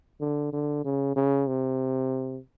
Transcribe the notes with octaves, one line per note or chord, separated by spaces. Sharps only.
D3
D3
C#3
C#3
C3